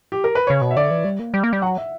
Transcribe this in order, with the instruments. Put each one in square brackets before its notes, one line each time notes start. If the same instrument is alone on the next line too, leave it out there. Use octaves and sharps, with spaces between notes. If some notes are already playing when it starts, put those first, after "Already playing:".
[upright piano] G4
A#4
B4
[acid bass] C#3 [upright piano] C#5
[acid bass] B2
[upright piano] E5
[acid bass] D3 [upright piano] D5
[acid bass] E3
G3
A#3
G3
A#3
G3
[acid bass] F#3 [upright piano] F#5
[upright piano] E5